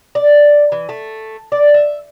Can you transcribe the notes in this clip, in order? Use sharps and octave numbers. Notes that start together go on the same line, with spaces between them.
D5
E3
A3
D5
E5